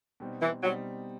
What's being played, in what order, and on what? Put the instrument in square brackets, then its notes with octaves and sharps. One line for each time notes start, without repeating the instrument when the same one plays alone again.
[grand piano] B2 G3 C4 D#4
[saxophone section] E3
[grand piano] B2 G3 C4 D#4 [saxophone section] F#3